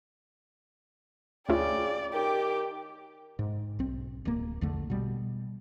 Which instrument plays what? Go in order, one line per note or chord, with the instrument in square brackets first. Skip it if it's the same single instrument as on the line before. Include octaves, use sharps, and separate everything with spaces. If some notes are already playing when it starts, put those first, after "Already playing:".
[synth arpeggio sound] D2 E4 F4 [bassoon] C#3 [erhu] D5 [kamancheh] G5
[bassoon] D#3 [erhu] G4 [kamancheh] G5 D6
[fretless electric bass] G#2
B1 C4
D1 A#3
A#1 E2 D3 A3
B2 G3